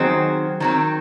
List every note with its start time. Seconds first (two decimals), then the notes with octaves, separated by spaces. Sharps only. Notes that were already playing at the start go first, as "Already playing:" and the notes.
Already playing: D#3 F#3 C4 G#4 C5
0.60 D#3 F#3 C4